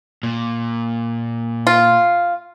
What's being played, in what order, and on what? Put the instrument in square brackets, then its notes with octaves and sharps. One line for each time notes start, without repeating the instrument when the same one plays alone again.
[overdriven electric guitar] A#2
[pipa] F4